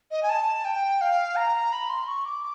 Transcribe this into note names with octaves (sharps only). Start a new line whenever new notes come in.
D#5
G#5
A5
G5
F5
A#5
B5
C6
C#6
D6